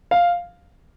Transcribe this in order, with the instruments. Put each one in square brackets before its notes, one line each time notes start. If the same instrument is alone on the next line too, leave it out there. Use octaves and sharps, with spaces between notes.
[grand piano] F5